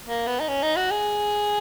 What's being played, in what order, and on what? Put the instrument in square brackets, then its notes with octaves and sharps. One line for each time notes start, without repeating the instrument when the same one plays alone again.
[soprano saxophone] A#3
B3
D#4
C#4
D#4
F#4
G#4